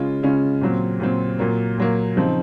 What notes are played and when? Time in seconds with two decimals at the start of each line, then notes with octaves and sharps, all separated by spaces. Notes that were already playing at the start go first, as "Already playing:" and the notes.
Already playing: C#3 G#3 C#4 F4
0.23 C#3 G#3 C#4 F4
0.61 A#2 F#3 C4
1.00 A#2 F#3 C4
1.39 A#2 F#3 A#3
1.77 A#2 F#3 A#3
2.16 C#3 F3 C4 D#4